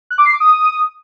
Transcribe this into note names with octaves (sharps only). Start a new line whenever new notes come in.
F#6
D6
C7
D6
D#6